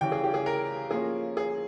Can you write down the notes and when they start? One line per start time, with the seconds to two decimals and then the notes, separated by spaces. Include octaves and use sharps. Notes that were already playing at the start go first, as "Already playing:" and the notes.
0.01 C#3 E3 G3 C#4 G5
0.12 G#4
0.24 G4
0.34 G#4
0.46 A#4
0.91 F3 A#3 C#4 G#4
1.37 G#4